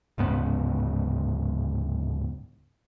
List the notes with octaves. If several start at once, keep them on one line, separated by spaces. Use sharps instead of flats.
D1 G#2 C#3 B3